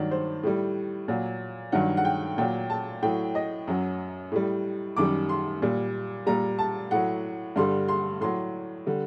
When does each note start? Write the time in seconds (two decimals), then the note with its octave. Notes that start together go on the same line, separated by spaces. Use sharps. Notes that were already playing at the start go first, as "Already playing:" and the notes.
Already playing: G2 D#3 F#3 D5
0.11 C5
0.43 A2 G3
1.08 A#2 F#3
1.72 G2 D#3 F#3 F#5
1.97 F#5
2.05 G5
2.38 A#2 F#3 G5
2.70 A5
3.02 A2 F#3 G5
3.35 D#5
3.68 F#2 F#3
4.32 A2 G3
4.96 F#2 D#3 G3 D6
5.29 C6
5.62 A#2 G3
6.27 A#2 G3 A#5
6.59 A5
6.91 A2 F#3 F#5
7.56 G2 D3 G3 C6
7.88 C6
8.21 A2 F#3 C6
8.87 D3 G3